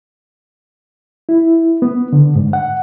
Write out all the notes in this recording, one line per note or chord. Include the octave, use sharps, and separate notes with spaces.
E4
B3
D3
G#2
F#5